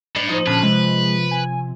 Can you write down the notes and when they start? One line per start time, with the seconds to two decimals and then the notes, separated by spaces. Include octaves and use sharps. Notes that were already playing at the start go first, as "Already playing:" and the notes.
0.16 A2 D4
0.29 F3 D#4
0.47 A#2 D3 C#4 B4 A5
0.63 C3 G#3
1.31 G#5